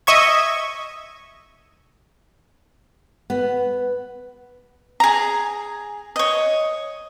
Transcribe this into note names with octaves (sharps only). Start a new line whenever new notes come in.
D#5 E5 C#6 G#6
B3
G#4 A#5
C#5 D#5